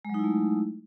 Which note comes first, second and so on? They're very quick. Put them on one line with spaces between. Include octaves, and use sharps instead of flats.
G#3 F#3 D#4 E4 A3